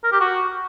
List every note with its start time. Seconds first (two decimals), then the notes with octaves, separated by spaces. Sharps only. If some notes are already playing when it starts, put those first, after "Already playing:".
0.04 A#4
0.12 G4
0.20 F#4